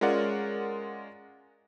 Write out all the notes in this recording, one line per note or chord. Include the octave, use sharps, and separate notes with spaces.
G#3 C#4 F4 A#4 D5 F#5